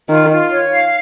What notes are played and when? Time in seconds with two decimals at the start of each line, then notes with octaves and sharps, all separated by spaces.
0.09 D#3 F4
0.30 F4
0.51 C#5
0.71 F5